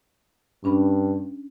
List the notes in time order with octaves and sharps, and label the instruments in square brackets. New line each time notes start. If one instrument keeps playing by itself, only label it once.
[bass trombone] G2 [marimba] C#4 D4 B5